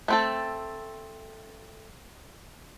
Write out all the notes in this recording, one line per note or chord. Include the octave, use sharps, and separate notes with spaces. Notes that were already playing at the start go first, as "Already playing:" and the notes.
A3 C4 A4